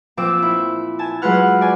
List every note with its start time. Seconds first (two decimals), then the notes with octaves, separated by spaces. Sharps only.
0.17 A#2 F3 C4 D6 E6
0.42 E4
0.99 G#5 A5
1.22 F#3 G#3 F4 B4 F#5 F6
1.61 D5 G#5